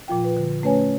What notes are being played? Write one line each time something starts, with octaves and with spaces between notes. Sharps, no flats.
A#2 F3 F4 G5
B4
D3
A3 C#4 B4 C#5 G#5